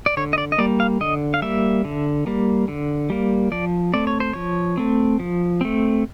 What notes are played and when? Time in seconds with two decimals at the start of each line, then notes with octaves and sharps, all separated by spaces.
0.06 D5
0.17 D3 C#5
0.33 D#5
0.38 D5
0.52 D#5
0.58 G3 A#3 D5
0.80 F5
1.01 D3 D#5
1.34 F5
1.42 G3 A#3 E5
1.85 D3
2.27 G3 A#3
2.68 D3
3.10 G3 A#3
3.52 F3 D5
3.94 A3 C4 D5
4.07 C#5
4.20 C5
4.33 F3 C#5
4.77 A3 C4
5.20 F3
5.61 A3 C4